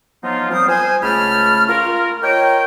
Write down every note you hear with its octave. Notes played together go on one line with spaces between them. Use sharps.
F3 F#3 B3 D#4 F4
F3 G3 C4 A#4 C5 D#6
C5 G#5
C#2 A3 A5 B5 F6
F4 A#4
A#4 C#5 D#5 G5